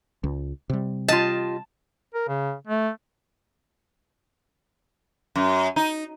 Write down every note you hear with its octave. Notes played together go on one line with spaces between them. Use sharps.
C#2
C3 G3
F4 G4 D#5 A5
A#4
C#3
A3
F#2
D#4